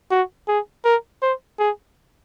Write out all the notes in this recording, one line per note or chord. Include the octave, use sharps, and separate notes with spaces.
F#4
G#4
A#4
C5
G#4